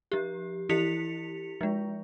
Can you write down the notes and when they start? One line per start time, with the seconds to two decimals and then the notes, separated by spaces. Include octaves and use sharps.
0.12 F3 G4
0.69 E3 E4 G4 B6 C#7 F7
1.61 F3 G#3